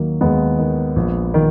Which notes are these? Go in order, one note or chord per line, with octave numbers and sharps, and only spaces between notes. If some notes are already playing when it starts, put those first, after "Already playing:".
Already playing: D#2 D#3 F#3 A#3
D#2 G#3 B3
D#3
A#1
D#3